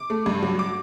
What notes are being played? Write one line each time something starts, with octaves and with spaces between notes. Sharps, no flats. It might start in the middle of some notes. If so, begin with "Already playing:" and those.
Already playing: D6
A3
G2
F#3
D6